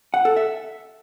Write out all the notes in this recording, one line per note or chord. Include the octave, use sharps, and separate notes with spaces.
F#5
A4
E5